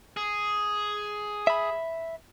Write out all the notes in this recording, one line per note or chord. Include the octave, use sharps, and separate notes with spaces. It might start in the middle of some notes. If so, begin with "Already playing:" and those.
G#4
E5 B5